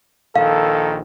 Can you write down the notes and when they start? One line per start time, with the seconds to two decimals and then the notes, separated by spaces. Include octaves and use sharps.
0.36 A#1 D#3 A4 F5